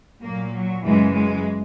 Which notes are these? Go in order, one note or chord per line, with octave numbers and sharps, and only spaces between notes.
A#2 F#3 A#3
F#3
F#2 C#3 E3 G#3
G#3